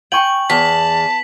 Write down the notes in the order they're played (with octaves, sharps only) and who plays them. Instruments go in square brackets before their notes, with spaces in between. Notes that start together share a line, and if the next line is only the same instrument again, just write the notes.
[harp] G5 G#5 C#6 [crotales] F#7
[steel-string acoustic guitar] E2 [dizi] A5 [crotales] B6